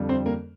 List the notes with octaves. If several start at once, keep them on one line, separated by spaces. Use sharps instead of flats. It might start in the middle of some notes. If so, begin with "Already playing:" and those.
Already playing: F2 D3 G3
C4 C5
A#3 A#4